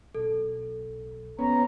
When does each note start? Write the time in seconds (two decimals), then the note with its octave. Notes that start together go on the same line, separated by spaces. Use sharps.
0.15 B1 A4
1.39 F3 B3 C#4 A#5